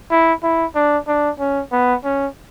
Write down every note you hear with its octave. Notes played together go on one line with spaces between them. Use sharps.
E4
E4
D4
D4
C#4
B3
C#4